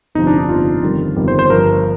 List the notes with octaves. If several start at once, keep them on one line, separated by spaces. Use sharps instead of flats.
G1 F2 C3 F3 D#4
D4
D#4
G1 F2 C3 F3 F4
G1 F2 D#3 G3
G1 F2 D#3 G3
C5
C5
G1 G2 F3 A#4